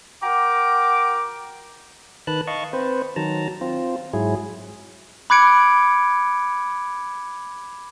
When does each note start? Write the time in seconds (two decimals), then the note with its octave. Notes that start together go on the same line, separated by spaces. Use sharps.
0.23 F#4 A#4 G5 A#5 D6
2.27 D#3 B4 A5 F#6
2.47 D#5 F5 A5 C#6
2.73 C4 B4 C5
3.16 D#3 F#3 A5 A#5
3.61 C4 F4
4.13 G#2 F#3 E4 G#4
5.30 B5 D6 F#6 G#6 C#7 D7